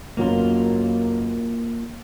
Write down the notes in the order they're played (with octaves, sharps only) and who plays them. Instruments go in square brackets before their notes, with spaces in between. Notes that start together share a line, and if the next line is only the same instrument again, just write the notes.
[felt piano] F#1 F#3 B3 [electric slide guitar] A#3 F4